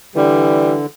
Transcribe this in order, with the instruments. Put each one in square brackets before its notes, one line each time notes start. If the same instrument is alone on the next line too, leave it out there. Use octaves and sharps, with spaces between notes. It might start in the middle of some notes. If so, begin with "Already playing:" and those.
[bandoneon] D3 [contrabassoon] E3 [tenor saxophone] G3